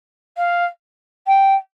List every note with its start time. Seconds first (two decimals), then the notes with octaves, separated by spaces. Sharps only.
0.36 F5
1.27 G5